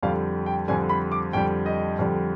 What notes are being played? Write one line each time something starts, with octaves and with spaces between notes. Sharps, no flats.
F2 D3 G3 F5
G5
F2 D3 G3 G#5
B5
D6
F2 D3 G3 G5
D#5
F2 D3 G3